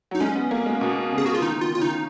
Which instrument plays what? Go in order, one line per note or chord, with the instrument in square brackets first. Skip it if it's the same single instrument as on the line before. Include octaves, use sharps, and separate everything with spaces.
[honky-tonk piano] F#3 [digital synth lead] D#4
[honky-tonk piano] G#3 [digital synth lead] C#4
[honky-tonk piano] B3
A#3
G#3
B2
C#3
[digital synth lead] G#4
F#4
F4
[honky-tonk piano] D#3 [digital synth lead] D#4
[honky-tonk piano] D#3 [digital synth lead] F4
[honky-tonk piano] C#3 [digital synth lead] F4
[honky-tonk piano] D#3 [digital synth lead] D#4